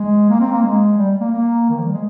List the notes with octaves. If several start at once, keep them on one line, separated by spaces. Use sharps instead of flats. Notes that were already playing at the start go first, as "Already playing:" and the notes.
Already playing: G#3
A#3
C4
A#3
G#3
G3
A#3
A#3
D#3
F3
G3
G#3